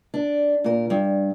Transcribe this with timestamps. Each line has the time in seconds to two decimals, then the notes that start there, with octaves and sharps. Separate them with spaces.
0.14 D4
0.64 A#2 A#4
0.90 G2